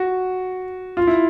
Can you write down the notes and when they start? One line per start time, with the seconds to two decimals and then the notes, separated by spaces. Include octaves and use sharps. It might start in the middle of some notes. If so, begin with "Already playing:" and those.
Already playing: F#4
0.97 F4
1.07 E4